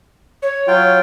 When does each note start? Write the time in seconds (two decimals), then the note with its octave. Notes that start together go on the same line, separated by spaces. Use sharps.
0.42 C#5
0.68 F#3 F4 G5